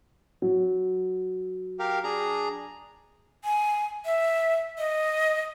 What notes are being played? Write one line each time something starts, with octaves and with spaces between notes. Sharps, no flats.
F#3
G4 A#4 F5
D4 G#4 A#5
G#5
E5
D#5